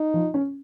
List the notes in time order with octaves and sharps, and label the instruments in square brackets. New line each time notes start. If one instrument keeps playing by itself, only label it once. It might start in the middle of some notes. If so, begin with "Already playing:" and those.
Already playing: [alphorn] D#4
[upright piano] F3
C#4